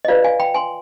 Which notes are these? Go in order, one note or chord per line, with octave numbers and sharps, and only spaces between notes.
D#5
F4 B4 D5 F5
F5 G#5
G5 B5
G#5 C6